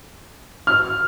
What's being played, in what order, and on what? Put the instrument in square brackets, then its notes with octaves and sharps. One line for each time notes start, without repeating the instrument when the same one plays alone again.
[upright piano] F6